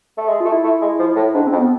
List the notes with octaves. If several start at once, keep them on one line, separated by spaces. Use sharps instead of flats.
A3
G#3 G#4
F4
A3
E4
A3
G#3
F3
A2
G#2 D4
C4
F2
B3